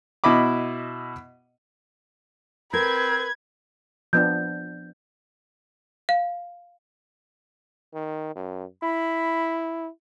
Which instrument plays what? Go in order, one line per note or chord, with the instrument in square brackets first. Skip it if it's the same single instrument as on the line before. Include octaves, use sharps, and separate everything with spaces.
[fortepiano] B2 E4 D#5 B5 D6
[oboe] C4 [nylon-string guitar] A#4 [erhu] B4 [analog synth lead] G#6
[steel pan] F3 B3 D4 [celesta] G6
[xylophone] F5
[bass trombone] D#3
F#2
[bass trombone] E4 [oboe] B5